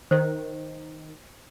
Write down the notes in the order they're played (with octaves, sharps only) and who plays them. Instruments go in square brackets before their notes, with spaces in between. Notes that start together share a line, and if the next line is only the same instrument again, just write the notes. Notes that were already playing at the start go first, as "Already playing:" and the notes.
[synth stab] D#3 [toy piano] C5